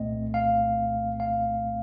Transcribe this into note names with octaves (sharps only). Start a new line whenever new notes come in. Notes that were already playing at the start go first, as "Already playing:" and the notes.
Already playing: C2 A#2 A3 C4 D#5
F5
F5